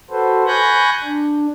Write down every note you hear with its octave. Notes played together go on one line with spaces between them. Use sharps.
F#4 A4 B4 C5
G#5 B5 C#6 F#6 G6 A#6
D4